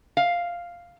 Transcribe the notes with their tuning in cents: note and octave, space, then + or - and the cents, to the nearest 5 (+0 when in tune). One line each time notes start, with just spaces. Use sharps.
F5 +0